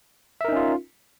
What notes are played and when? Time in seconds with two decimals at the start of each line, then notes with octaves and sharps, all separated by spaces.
0.41 E5
0.45 A#4
0.49 D#4
0.52 C#4
0.56 F4